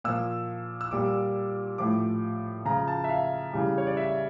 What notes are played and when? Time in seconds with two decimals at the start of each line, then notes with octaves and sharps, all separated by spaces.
0.04 A#2 F3 E6
0.81 E6
0.91 A#2 G3 D6
1.78 A2 F3 D6
2.65 C#3 A#5
2.70 F3
2.88 A5
3.04 E5
3.09 F5
3.53 C#3 E3 G3
3.78 C#5
3.87 D5
3.97 E5